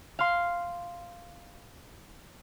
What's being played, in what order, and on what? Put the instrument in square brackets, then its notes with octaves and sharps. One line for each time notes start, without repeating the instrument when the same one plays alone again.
[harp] F5 C6